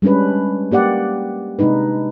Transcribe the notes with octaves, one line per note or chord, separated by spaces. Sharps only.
G3 G#3 C#4 D4 B4
A#3 G4 D5 F#5
C3 G#3 D4 D#4 B4